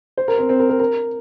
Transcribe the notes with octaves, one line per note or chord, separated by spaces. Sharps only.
C5
A#4
C4
C4
A#4
A#4
A#4